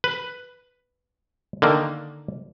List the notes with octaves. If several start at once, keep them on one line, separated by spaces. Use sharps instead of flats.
B4
D3 D#3 A#3